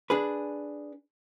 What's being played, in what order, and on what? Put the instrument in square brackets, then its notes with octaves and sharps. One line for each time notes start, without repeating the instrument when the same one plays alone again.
[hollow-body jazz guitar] D4 G#4 B4